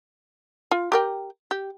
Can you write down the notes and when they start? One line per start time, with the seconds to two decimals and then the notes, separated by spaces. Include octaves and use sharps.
0.71 F4
0.92 G4 A#4 G5
1.51 G4